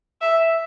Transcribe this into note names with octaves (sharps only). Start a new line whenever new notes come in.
E5